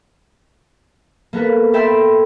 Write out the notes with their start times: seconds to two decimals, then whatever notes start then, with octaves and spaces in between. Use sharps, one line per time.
1.33 A#3 B3 A4 B4
1.73 A4 E5 G5 B5 C6 E6